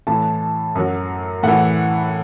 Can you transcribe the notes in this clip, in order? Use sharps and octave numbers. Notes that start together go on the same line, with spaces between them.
A2 E3 A5
F#2 F#3
A2 E3 F#5